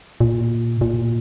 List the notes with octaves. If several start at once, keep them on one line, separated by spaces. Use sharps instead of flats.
A#2
A#2